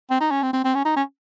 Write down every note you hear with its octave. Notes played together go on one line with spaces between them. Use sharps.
C4
D#4
C#4
C4
C4
C4
C#4
D#4
C#4